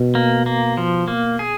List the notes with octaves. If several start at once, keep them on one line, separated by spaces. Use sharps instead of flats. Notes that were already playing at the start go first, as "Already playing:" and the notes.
Already playing: B2
A#3
A#3
F3
A#3
G#4